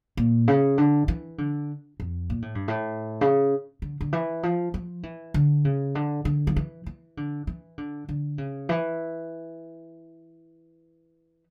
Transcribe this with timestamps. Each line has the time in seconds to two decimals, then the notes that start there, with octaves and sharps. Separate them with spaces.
0.17 A#2
0.48 C#3
0.78 D3
1.08 E3
1.38 D3
2.00 F2
2.30 A#2
2.42 A2
2.55 G2
2.68 A2
3.21 C#3
3.82 D3
4.01 D3
4.13 E3
4.43 F3
4.74 F3
5.03 E3
5.34 D3
5.65 C#3
5.95 D3
6.25 D3
6.47 F3
6.56 E3
6.86 E3
7.17 D3
7.47 E3
7.78 D3
8.09 D3
8.38 C#3
8.69 E3